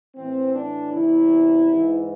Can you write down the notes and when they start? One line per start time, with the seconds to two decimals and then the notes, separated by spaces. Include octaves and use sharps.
0.16 A2 E3 C4
0.55 D4
0.94 E2 C3 E3 E4
1.71 G#2 E3